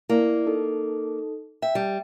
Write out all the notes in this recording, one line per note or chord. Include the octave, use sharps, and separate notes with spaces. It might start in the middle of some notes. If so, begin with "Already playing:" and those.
A#3 E4 D5
D#4 A4
E5 G5
G3